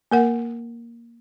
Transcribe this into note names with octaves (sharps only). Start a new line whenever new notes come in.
A#3 A#4 F#5